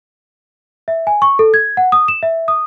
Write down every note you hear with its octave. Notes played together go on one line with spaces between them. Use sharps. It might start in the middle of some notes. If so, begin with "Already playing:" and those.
E5
G#5
C#6
A4
G#6
F#5
D#6
E7
E5
D#6